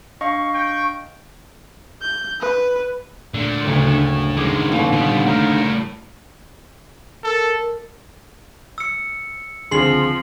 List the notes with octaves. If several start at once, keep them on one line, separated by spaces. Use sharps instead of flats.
D4 D#5 F5 C#6
G5
G6
B4
A#2 D3 A3
F#1 D2 A2
F#2 A2 D#3 G#3 D6 D#6 G#6
D#2 D3 E3
A#2 G3 B3 F#4
A2 G3 A#4 E5 A#5 D#6
A4 A#4
E6 C#7
C#2 D3 F3 C4 G#4 C6 C7 F#7